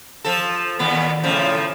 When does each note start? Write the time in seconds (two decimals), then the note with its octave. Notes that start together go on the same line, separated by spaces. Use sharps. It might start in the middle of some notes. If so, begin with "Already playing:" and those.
0.25 F3 A4
0.79 D#2 A#2 B3
1.23 A2 C#3 F3